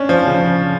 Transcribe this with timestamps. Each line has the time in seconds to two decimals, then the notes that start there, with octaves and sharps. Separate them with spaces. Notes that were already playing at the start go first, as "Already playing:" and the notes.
Already playing: C#4 D4
0.09 F3
0.27 C#3